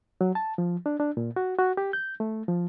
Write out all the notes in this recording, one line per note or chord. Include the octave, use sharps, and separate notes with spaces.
F#3
A5
F3
D4
D4
A#2
F#4
F#4
G4
G6
A3
F3